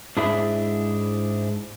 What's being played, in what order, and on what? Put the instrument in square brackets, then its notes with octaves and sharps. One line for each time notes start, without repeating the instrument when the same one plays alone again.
[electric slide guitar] G#2 D4 E4 G#4 E5